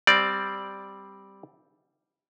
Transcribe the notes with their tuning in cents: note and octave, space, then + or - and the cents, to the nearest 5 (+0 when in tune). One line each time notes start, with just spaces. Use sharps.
G3 +0 C4 +0 D5 +0